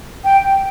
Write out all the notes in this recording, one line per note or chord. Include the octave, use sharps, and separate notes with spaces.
G5